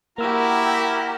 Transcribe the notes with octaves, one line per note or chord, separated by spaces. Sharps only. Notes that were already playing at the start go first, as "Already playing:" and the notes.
A#3 E4 F#4 G4 A#4 E6